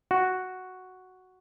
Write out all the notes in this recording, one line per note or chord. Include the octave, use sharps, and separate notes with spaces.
F#4